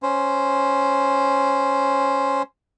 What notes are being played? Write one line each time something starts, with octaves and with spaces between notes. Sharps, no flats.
C#4 C5